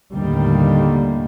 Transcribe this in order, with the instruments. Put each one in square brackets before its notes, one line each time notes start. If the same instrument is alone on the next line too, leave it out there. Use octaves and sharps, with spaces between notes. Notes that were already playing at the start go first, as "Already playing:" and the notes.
[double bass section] D#2 A2 D3 D#3 G3 A#3